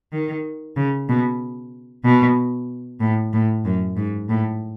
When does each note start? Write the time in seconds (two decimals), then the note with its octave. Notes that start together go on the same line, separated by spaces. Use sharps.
0.12 D#3
0.77 C#3
1.09 B2
2.05 B2
3.00 A2
3.33 A2
3.65 F#2
3.97 G#2
4.29 A2